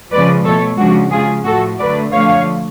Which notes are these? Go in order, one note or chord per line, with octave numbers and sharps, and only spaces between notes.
C#3 F3 G#3 B4 D5
B2 A3 A4 C#5
C#3 F3 G#3 D4 F#4
C#3 G#3 F4 G#4
A2 F3 A3 F#4 A4
D3 F#3 A3 B4 D5
D3 F3 A3 C#5 F5